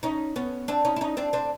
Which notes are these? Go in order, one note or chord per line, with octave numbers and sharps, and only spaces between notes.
C#4 D#4
B3 C#4
C4 D4
C#4 D#4
E4
C#4 D#4
C4 D4
C4 D4